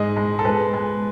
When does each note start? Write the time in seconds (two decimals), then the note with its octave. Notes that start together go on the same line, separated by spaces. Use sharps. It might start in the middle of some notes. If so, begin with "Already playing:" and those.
Already playing: G#2 G#3 D#5
0.17 G#3
0.39 A4
0.45 G#3 B4
0.74 G#3